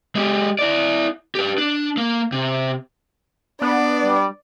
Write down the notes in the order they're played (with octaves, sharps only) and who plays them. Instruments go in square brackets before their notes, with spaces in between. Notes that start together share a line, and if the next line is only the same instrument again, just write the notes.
[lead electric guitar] G#3 G4
E4 D5
G4 B4
D4
A#3
C3
[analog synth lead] B3 [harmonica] D4 [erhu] D5
[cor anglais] G3